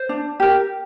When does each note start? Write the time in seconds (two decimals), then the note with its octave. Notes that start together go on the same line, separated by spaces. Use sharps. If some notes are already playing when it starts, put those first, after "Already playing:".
Already playing: C5
0.09 D4
0.40 G4 A#4